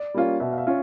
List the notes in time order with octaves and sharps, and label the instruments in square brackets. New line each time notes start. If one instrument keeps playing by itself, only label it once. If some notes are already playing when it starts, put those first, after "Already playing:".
Already playing: [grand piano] D5
[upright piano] G3 A#3 C#4 F4
[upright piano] B2 [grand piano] E5
[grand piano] F5
E5
[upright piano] C#4 F4